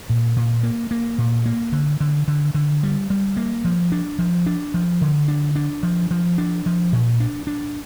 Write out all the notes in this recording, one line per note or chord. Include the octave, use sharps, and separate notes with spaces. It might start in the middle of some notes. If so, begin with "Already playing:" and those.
A#2
A#2
A#3
A#3
A#2
A#3
D3
D3
D3
D3
G3
G3
A#3
F3
D4
F3
D4
F3
D3
D4
D4
F3
F3
D4
F3
A#2
D4
D4